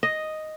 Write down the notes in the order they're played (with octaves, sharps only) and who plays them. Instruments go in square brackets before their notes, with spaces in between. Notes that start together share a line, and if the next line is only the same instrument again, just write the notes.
[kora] D#5